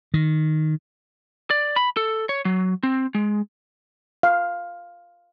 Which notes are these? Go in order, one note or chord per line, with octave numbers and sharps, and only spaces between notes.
D#3
D5
B5
A4
C#5
F#3
C4
G#3
F5